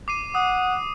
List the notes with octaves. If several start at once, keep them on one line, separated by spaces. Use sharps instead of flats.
D6 C7 D#7
F#5 D#6